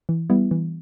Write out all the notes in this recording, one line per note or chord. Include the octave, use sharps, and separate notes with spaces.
E3
G3 B3 E4
E3